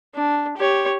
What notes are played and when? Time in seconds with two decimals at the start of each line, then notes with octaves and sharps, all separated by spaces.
0.15 D4
0.57 G4 C#5